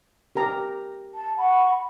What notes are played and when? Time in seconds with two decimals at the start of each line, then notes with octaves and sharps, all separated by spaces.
0.35 G4 A#4 A#5
1.13 A5
1.37 F#5 B5 C#6